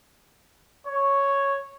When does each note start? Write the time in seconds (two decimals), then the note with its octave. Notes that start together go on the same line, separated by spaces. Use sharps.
0.85 C#5